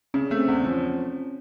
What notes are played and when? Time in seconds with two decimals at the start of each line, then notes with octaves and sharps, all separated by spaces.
0.14 C#3 C#4
0.30 A3 C4
0.48 E2 C#4
0.65 F3 C#4